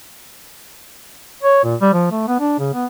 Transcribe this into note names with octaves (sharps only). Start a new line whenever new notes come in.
C#5
A#2
G3
F3
A3
B3
D4
C#3
B3